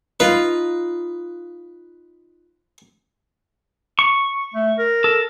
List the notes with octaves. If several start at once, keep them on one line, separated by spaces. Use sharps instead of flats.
D#4 F4 B4
C#6
A3
A#4
A4